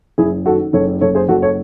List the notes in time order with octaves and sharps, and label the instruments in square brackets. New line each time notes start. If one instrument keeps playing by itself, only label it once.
[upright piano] F#1 E4 G#4
D#3 F#4 A4
F#1 A4 C#5
F#1 A4 C#5
G#4 C5
F#1 F#4 A4
A4 C#5